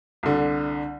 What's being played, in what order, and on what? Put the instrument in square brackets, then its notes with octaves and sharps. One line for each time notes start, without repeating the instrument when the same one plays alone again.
[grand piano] C2 D3